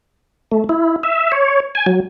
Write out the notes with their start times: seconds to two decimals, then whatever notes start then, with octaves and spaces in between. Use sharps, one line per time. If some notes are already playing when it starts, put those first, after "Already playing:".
0.52 A3
0.69 E4
1.03 E5
1.32 C#5
1.75 G#5
1.86 F#3